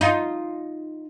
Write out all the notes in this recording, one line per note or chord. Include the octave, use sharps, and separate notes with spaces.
D#4 F4